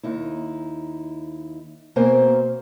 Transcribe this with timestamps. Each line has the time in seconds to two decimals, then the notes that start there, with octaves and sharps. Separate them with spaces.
0.03 D#2 D#4 E4
1.96 B2 A#3 C4 A#4 C5 G#5